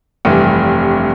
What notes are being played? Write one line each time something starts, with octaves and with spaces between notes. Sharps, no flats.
F1 G2 E3